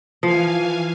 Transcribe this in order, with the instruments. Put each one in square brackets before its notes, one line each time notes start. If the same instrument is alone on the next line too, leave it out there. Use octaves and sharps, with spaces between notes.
[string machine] E3 F5 G#5 [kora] F3